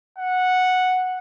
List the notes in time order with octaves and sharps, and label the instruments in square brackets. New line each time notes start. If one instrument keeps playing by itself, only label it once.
[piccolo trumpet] F#5